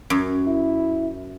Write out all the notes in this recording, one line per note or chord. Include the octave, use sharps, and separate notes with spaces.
F#2
E4